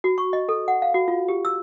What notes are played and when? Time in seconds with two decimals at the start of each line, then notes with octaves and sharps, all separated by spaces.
0.04 F#4
0.18 C#6
0.33 D#5
0.49 A4
0.68 F#5
0.82 F5
0.94 F#4
1.08 F4
1.28 G4
1.45 E6